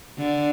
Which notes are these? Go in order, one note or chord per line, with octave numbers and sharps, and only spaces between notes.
D3